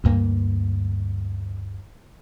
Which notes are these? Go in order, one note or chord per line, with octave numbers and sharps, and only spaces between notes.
D2 G2 A#3